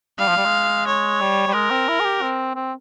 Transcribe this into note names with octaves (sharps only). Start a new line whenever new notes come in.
G3 F5
F3
G3
G#3
C#5
G3
G3
G#3 A#4
C4
E4
G#4
G4
C4
C4